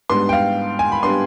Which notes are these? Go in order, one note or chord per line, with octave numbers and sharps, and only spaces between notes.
G#2 G3 B3 D4 C6
G5
F5
G#5
B5
G3 B3 D4 C6